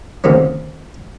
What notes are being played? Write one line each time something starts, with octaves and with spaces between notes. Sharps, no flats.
D2 C3 D#3 A#3 C#4